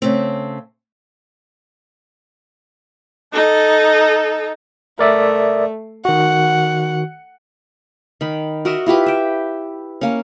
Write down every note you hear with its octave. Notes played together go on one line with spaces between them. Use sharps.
C#3 A3 C4
D#4 A4
A3 A#4 D5 E5
D#3 F#4 F#5
D#3 B5
F#4 A#4 D#5 E5
E4 F4 G4 B4
E5 G5
A#3 C#4